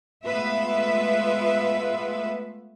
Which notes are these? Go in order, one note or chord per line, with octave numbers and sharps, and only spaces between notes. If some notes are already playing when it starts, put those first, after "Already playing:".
G#3 A3 B3 F4 B4 E5